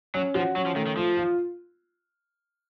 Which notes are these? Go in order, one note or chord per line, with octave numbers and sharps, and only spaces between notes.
F#3 C#4
F3 F#4
F#3 C#4
F3
D#3 A3
D#3
F3 F4
F4